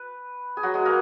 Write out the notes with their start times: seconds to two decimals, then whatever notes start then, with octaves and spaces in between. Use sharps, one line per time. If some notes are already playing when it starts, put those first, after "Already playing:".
Already playing: B4
0.57 G#4
0.63 F#3 F#4
0.74 G#3 G#4
0.86 A#3 A#4